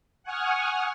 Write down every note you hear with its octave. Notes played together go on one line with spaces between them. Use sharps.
F#5 G#5 C#6 D#6 F6